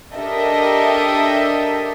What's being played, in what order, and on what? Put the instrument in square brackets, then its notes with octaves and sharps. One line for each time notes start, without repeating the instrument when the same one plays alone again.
[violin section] D4 G4 A4 A#4 D#5 E5